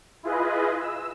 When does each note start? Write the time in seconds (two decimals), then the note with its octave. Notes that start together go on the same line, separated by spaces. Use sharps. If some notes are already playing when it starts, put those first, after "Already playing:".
0.23 E4 F4 G#4 B4 D#5
0.79 E6